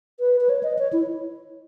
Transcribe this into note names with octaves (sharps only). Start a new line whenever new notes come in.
B4
B4
C#5
D#5
C#5
E4